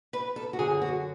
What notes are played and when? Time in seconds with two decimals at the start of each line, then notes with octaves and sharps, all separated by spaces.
0.13 B4
0.36 A4
0.53 F#4
0.59 F#2 D3 G#4
0.81 F#4